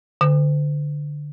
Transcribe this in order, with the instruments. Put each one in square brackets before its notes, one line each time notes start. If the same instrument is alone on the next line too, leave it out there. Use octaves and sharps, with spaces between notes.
[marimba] D3